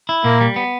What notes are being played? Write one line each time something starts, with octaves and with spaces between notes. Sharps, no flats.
E4
A#2 A#3
G3
B3